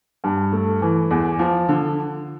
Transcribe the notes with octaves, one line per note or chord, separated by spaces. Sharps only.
G2
A3
E3
E2
F3
D3